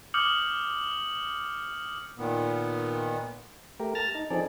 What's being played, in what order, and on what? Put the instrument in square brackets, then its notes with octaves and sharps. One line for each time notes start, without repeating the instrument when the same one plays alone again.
[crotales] D6 D#6 F6 G6 C#7 F#7
[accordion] A#2 D#3 B3
[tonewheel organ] A3 G4 A#4
A5 F6 A6 A#6
D#4
F3 C4 D#4 G#4 A4 D5